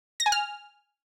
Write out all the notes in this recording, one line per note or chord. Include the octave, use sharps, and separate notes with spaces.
A#6
G#5
F6